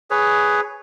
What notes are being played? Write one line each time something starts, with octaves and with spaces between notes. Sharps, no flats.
G#4 B4 C#5